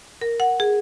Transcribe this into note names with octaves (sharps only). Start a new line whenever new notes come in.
A#4
F#5
G#4